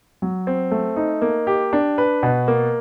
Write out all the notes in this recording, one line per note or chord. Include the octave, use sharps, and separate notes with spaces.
F#3
C4
A3
D#4
A#3
G4
D4
B4
B2
A#3